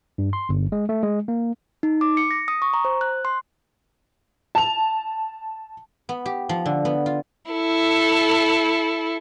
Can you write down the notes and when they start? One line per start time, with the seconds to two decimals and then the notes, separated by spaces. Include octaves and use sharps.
0.18 G2
0.33 C6
0.49 G1
0.72 G#3
0.89 A3
1.03 G#3
1.28 A#3
1.83 D#4
2.01 D6
2.17 C#7
2.31 A#6
2.48 D#6
2.62 C#6
2.74 A#5
2.85 C5
3.01 F#6
3.25 C6
4.55 A5 F7
6.09 B3
6.26 G4
6.49 F3
6.65 D3
6.85 B3
7.06 F4
7.52 E4 A4